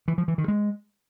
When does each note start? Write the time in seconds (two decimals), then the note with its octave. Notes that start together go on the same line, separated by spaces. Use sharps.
0.08 E3
0.18 F3
0.28 E3
0.38 D#3
0.48 G#3